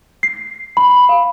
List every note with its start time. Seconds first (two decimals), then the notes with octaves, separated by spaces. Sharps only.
0.23 C7
0.77 B5
1.09 F5